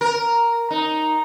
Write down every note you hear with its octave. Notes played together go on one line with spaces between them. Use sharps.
A#4
D#4